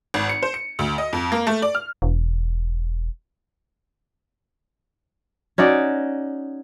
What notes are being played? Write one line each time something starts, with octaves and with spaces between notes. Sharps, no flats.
G#1
C#7
C5
C#7
D2
D#5
F2
A#3
A3
D5
F6
E1
C#4 D#4 F#4 D5